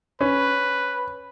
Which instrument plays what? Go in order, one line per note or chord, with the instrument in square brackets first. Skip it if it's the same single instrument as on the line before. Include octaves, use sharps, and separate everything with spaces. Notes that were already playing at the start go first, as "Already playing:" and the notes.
[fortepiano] C#4 [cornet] B4